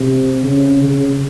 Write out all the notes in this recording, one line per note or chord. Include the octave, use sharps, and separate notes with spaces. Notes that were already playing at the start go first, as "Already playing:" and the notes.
Already playing: C3
C#3
C#3